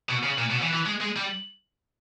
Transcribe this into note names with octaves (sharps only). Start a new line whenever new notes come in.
B2
C#3
A#2
B2
E3
E3
G#3
G#3
G3